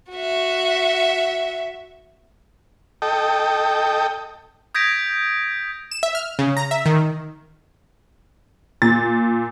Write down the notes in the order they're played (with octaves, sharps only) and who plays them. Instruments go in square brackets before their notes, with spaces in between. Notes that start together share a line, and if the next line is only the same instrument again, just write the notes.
[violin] F#4 E5
[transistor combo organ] A4 D#5 G5
[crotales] D#6 G6 G#6 A#6 B6 D7
[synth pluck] E7
E5
F6
C#3
A#5
E5
D#3
[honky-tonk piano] A#2 A6